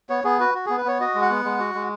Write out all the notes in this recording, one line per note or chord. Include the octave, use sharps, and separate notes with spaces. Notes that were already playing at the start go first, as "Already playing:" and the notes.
B3 C#5
B3 G#4
F#4 B4
F#4
B3 G#4
B4
B3 C#5
F#4 D#5
G#3
F#5
B3
G#3
F#4
G#3